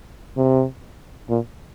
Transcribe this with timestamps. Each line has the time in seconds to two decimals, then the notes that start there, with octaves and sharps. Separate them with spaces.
0.36 C3
1.29 A#2